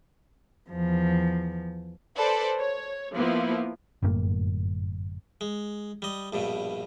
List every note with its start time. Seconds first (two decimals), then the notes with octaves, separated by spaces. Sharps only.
0.70 E2 F3
2.16 A4 B4 C5 D5
2.58 C#5
3.14 F3 A#3 B3 E4
4.03 G1 F#2 A2 A#3
5.41 G#3
6.02 G3 D#5
6.33 A#1 G2 B2